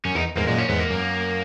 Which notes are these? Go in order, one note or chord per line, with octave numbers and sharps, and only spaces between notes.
F#2 C#4
E2 D#4
E2 G#2 A#3
F#2 A#2 G#3
C#4
E2 G#2 B3
A#3
F#2